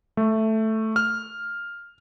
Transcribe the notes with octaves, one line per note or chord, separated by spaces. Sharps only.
A3
F6